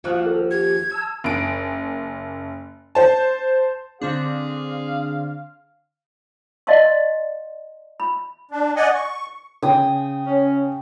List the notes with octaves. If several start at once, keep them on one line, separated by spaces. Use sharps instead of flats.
D#2 F3 F#4 F5
A4
G4 G#6
A5 E6
F#1 D7
C5 A5
D3 C4 D4 G#4 F5
D5 D#5 F5 A5 C6 C#6
B5
D4
D5 D#5 F#5 G#5
C#6
C#3 G5 G#5 D#6
C#4